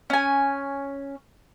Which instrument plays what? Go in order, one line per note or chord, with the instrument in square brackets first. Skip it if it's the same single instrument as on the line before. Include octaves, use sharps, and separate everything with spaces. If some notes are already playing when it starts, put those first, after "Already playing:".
[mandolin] C#4 G#5